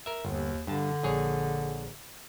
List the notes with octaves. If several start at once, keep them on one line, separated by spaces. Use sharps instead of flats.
A#4 E5
G1 D#2
G2 D3 A5
A#1 G#4 C#5